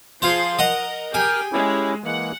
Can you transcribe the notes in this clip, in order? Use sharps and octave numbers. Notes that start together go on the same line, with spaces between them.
F3 F4 G#4 C5 C6
A#4 D#5 F#5 A#5
G4 G#4 A#4 G5 G#5 F6
G#3 C#4 E4 G4
E3 G#3 A#3 F#5